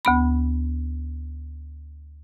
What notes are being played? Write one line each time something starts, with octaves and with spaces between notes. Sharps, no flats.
D2 B3 B5